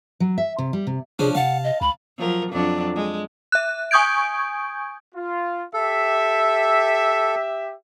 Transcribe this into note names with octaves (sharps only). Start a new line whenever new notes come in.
F#3
E5
C3
G3
C3
C3 F3 C#4 D4 G#4
C3 F5 F#5 A5
D#5
C#2 B5
F3 F#3 A#4
F2 F#3 D4
G#3
E5 F#6
G#5 C#6 D#6 G6 G#6 D7
F4
G4 A4 E5